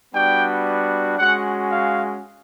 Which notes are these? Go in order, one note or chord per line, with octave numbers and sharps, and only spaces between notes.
G3 B3 D4 F#4 G5
G#3 C#4 F#4 F#5
F5